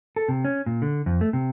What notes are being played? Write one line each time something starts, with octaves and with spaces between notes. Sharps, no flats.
A4
C3
C#4
A#2
D3
F2
A3
C3